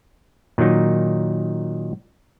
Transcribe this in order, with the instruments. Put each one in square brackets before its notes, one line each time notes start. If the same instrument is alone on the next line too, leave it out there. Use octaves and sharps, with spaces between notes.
[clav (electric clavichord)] A#2 D#3 F#3 D#4